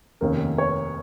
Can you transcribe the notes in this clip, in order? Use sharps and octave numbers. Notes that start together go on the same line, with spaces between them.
F1 D#2 D#3 A#3 C#4 A#4
C#5